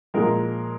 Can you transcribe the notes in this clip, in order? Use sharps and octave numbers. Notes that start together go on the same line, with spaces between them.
A#2 F3 G#3 A#4